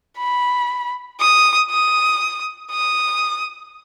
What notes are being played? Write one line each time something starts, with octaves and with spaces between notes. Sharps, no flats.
B5
D#6
D#6
D#6